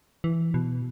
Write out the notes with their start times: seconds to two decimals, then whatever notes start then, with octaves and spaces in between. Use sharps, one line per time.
0.24 E3
0.54 B2